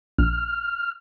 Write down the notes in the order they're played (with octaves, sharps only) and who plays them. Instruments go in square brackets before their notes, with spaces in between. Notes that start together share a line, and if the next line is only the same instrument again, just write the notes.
[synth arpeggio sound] A#1 [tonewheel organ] F6